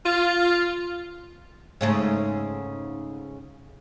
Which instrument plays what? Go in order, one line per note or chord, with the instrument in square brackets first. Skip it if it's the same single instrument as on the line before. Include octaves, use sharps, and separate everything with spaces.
[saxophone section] F4
[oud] G#2 C#3 A3